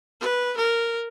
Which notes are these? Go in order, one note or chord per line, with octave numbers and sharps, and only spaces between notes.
B4
A#4